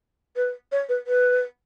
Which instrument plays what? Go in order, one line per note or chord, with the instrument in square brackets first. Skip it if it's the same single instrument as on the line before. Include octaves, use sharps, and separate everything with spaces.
[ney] B4
C#5
B4
B4